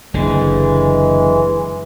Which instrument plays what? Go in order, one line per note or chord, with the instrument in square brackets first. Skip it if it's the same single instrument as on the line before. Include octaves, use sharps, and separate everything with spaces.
[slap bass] F#1 D3 [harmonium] E3 G#3